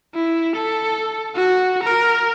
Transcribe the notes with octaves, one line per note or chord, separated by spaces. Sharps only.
E4
A4
F#4
A#4